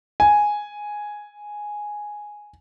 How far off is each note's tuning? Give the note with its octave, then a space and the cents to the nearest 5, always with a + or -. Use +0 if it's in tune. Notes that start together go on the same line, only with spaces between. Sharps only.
G#5 +0